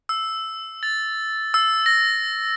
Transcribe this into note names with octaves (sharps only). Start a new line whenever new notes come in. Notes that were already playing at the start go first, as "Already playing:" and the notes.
E6
A6
E6
A#6